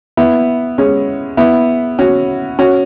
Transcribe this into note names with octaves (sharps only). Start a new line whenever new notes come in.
B3 E4
G#3 C#4
B3 E4
C#4 F#4
C#4 F#4